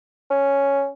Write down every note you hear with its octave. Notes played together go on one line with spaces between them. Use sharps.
C#4